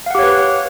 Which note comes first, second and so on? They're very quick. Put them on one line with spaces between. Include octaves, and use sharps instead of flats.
F5 F#5 G4 C#5 B4